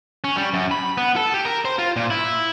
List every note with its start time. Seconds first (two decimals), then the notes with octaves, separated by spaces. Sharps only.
0.24 C#4
0.37 G3
0.54 F#2
0.71 B5
0.98 B3
1.16 A4
1.34 G4
1.45 A#4
1.65 C5
1.79 F4
1.96 A#2
2.10 E4